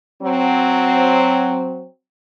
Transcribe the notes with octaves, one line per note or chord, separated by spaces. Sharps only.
F#3 C4